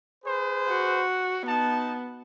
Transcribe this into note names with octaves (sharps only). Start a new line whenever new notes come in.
G#4 B4 C5
F#4
B3 D#4 A5